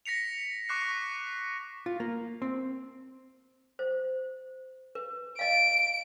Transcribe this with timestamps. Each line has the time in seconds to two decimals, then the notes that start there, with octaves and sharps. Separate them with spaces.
0.06 A#6 B6 C#7 F7
0.69 C#6 D6 F#6 C7
1.86 F4
2.00 A#3
2.42 C4
3.79 C5
4.95 B4
5.39 D#5 F5 D7